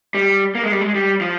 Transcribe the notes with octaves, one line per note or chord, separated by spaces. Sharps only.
G3
A#3
G#3
G3
G#3
G3
F3